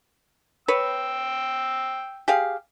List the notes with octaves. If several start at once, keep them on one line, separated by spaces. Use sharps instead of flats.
B4 C#5 G5 E6
G4 G#4 F5